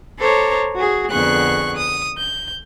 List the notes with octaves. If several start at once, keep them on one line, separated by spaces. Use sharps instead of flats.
A4 C5 C#5 A#5 D6
F#4 G#4
F2 D3 B3 G#4 C#6 F#6
D#6
G6